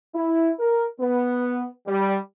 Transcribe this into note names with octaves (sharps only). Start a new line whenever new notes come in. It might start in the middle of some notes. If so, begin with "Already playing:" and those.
E4
A#4
B3
G3